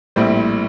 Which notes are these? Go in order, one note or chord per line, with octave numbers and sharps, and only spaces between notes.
A#1 A2 G3 C4